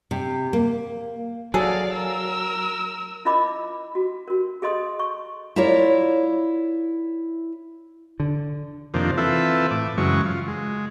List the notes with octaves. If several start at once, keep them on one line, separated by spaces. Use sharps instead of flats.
C3
A#3
F#3 G#4 A4 D5 F5
A#4 E6
E4 F4 A#4 D#5 B5 D6
F#4
F#4 A#4
G#4 A4 D#5 C6 D#6
C#6
E4 F4 A#4 C#5 D5
D3
F2 C3 D#3 F3 A#3 D4
E3 C4 F4 A4 B4 E5
A2 D6
F#2 C#3 E3 F#3 G#3 C#6
F4
G#3